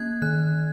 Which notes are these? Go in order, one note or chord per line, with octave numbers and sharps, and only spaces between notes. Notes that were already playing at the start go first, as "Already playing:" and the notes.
Already playing: A#3 C#4 F#6 G#6
D#3 F#6